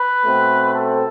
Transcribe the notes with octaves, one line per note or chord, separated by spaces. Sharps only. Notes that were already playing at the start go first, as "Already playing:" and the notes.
Already playing: B4
B2 A3 C4
A4